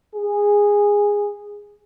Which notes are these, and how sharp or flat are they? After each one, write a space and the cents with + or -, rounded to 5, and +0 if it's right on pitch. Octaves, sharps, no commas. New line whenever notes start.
G#4 -15